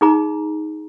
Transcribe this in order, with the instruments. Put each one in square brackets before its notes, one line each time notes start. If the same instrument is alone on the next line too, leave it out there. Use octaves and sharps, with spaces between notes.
[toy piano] D#4 G#4 A#5